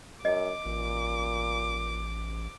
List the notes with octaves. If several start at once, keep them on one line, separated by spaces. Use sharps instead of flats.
F#2 D#5 D6
A1 A#2